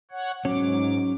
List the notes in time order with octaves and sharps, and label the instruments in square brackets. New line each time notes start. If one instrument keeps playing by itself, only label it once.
[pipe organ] C#5 F#5
[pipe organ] G#2 D6 [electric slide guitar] F#3 C#4 C#5